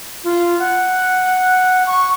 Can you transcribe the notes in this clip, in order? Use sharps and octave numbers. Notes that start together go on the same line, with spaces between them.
F4
F#5
C#6